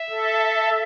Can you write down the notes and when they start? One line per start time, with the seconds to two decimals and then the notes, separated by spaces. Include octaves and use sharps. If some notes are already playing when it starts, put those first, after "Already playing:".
Already playing: E5
0.09 A4